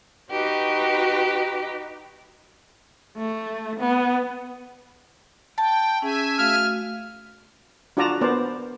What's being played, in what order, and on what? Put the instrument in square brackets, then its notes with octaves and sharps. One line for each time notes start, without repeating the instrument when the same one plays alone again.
[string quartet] D#4 F#4 G4 B4
[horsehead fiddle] A3
B3
[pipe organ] G5 [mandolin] A5
[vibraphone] C#4 G#4 [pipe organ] E5 G#5
[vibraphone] A3 F#4 F5 [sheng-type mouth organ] F6
[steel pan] D4 F4 F#4 D5 A5 A#5
B3 A#4 C5 D5